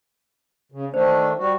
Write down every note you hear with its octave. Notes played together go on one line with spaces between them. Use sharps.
C#3
D#3 A3 D4 C5
G3 F#4